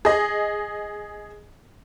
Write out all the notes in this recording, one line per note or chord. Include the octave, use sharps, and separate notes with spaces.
G#4 D#5